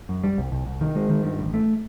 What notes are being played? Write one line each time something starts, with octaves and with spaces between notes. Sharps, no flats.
F#2
G3
C2
C2
C2
D#3
G#3
D#3
G2
A1
A3